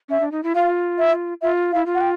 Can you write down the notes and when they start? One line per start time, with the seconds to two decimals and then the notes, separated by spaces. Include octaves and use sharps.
0.09 C#4 E5
0.20 D4
0.32 D#4
0.43 E4
0.55 F4 F5
0.98 E5
1.42 F4 E5
1.72 E4 F5
1.86 F4
1.95 F#5
2.01 G5